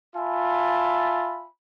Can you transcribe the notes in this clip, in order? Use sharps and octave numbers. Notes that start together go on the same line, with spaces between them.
F4 E5 G#5 A5 B5